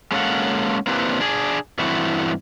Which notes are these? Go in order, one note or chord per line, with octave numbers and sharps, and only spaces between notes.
G#3 A#3 C#4 A4 F5 F#5
A#3 C4 D4 E4 G4 B4
D4 G#4
G2 E3 A3 C4 E4 F#4